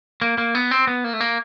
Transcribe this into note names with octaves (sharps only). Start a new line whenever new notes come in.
A#3
A#3
B3
C4
B3
A#3
A3
A#3